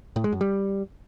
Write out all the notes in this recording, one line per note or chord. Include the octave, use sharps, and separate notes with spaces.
A2
G#3
F#2
G3